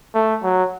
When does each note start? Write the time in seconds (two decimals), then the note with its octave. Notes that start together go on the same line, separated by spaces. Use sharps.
0.15 A3
0.43 F#3